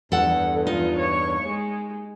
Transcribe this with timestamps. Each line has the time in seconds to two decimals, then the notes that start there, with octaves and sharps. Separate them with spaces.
0.12 E2 G2 A4 F#5
0.67 D#4 F4
0.99 C#5 C#6
1.47 G#3